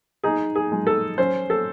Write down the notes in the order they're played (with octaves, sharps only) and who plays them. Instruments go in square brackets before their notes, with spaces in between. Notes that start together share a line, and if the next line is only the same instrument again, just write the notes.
[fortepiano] D#4 G#4
G#4
G#3
A4
C#4 C5
A4